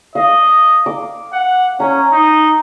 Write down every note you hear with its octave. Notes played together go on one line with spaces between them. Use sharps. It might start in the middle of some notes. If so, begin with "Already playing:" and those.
D#5 F5
D6
F#5
C#4 A#5
D#4